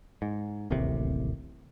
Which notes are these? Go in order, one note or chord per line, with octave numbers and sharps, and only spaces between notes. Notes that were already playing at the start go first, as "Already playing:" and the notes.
G#2
D1 A1 D#2 C3